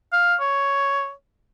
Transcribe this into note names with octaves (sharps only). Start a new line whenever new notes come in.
F5
C#5